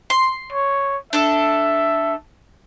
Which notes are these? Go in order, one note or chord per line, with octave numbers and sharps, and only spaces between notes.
C6
C#5
D4 A4 E5